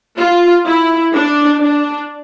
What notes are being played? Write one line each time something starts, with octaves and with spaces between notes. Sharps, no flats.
F4
E4
D4
D4